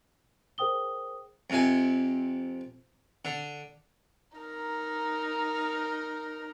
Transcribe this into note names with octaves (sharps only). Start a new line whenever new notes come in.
G#4 A#4 C5 G5 D#6 G7
F2 C3 G#5
D3
D#4 A#4